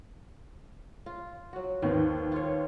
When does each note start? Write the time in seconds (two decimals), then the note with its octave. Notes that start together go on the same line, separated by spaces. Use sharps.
1.06 F4
1.53 F#3 F#4
1.82 D#2 D#3 F3 B3
2.32 F4 C#5